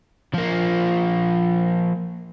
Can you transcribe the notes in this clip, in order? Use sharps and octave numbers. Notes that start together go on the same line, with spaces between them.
F3 A#3